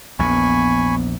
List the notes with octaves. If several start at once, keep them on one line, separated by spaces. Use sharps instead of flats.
A#1 E2 B3 G#5 B5 C#6